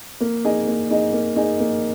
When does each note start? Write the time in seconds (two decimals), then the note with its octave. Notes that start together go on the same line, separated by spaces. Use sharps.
0.21 A#3
0.45 D#4 G#4 D#5
0.67 A#3
0.90 D#4 G#4 D#5
1.13 A#3
1.36 D#4 G#4 D#5
1.60 A#3